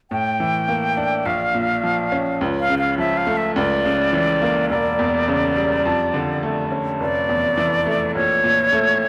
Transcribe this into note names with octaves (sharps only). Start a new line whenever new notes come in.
A2 G5
E3
A#3
D4
A#1 F5
A#2
F3
C#4
C#2
F5
C#3
F5
F3 E5
F5
A3
E5
C#2 D5
C#3
E3
A#3
E1 D5
E2
C#3
G3
F2
D3
A3
C#4
F1 D5
E2
E3
A3
A#1 C#5
A#2
A3